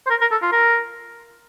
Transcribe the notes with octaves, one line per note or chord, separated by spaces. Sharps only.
C5
A#4
A#4
A4
F4
A#4